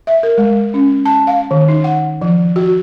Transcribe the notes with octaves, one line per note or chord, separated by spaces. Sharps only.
E5
A#4
G#3
C#4
A5
F5
D#3
D#4
F#5
F3
F#4